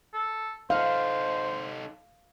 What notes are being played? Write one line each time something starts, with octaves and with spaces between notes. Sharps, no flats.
A4
D#4 A4 C5 F5